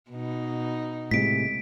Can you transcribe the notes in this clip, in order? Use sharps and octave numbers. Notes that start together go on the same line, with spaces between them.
B2 D#4
A2 C3 G#3 B6 D7